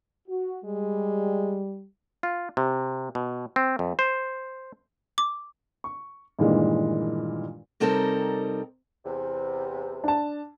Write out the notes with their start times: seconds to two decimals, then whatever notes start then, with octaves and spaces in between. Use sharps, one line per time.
0.28 F#4
0.65 G3 G#3
2.23 F4
2.57 C3
3.15 B2
3.56 C4
3.79 F2
3.99 C5
5.18 D6
5.84 C#6
6.39 G2 A#2 D#3 E3 G#3
7.80 C3 G3 C4 D#4 A4 A#4
9.04 E2 C3
10.04 D4 A5